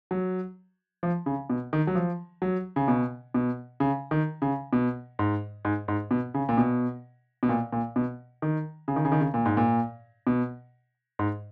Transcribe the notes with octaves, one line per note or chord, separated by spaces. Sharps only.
F#3
F3
C#3
B2
D#3
F#3
F3
F#3
C#3
B2
B2
C#3
D#3
C#3
B2
G#2
G#2
G#2
B2
C#3
A#2
B2
B2
A#2
A#2
B2
D#3
C#3
D#3
C#3
D#3
C#3
A#2
G#2
A#2
B2
G#2